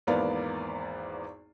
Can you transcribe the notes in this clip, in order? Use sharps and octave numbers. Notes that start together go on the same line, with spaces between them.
G#1 E2 A#3 B3 D5 F5